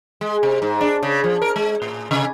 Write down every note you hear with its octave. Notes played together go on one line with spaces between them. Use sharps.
G#3
C3
G#2
D4
C#3
F3
A#4
G#3
A2
C3